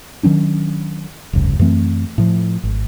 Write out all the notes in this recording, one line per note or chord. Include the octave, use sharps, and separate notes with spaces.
D#3 F#3 C#4 D4
F1 C#2 G2
F#2 E3 A3 C4
A2 F3
G#1